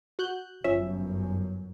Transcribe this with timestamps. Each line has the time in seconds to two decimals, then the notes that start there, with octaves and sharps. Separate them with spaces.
0.19 F#4 F#6 G6
0.64 G1 F#2 F3 C#4 E5